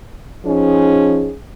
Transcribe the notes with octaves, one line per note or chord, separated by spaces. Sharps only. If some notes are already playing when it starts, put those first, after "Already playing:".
F3 C#4 D#4 G#4